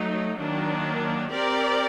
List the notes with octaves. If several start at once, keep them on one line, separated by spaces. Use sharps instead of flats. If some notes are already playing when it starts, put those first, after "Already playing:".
Already playing: F#3 A3 D#4
D#3 F#3 A#3 D4
C4 G4 A#4 D5